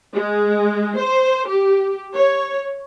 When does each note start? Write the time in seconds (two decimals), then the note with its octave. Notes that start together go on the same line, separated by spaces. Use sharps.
0.15 G#3
0.98 C5
1.48 G4
2.15 C#5